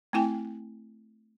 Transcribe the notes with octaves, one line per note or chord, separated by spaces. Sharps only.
A3 C4 E4 G5 G#5